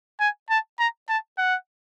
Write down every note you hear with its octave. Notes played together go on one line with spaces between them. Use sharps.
G#5
A5
A#5
A5
F#5